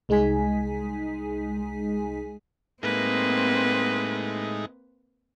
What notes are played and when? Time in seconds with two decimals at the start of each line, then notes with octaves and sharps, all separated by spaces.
0.09 C2 G#3 D#4 G#4 G#5 B6
2.83 A2 G#3 A#3 C4 D#4 B4